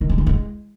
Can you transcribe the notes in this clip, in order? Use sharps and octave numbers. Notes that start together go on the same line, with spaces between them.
D#3
G#3
E3
G#3